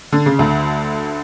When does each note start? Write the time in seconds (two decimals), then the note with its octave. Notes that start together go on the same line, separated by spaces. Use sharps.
0.12 D3
0.26 C#3
0.39 D2 D3